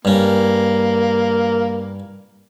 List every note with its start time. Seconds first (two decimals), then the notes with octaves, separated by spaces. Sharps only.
0.05 G2 A#3 C#4